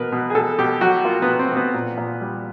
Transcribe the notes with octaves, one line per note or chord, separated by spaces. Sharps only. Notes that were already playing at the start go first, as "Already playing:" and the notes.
Already playing: B2 A#3 A#4 B4
B2
G#4
B2 A4
B2 G4
F#3 F#4
A#3 F4
B3
B2
C4
B2
B3
A#2
A#2
G3